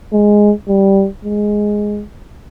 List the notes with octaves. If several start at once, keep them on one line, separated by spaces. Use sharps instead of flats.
G#3
G3
G#3